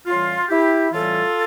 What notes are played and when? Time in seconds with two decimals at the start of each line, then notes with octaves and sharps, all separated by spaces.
0.06 A2 E3 G3 C#4 F4
0.49 E4 G4
0.93 A2 E3 G3 C#4 F4 A4